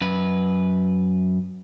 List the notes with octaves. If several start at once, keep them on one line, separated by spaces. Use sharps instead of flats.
F#2 B4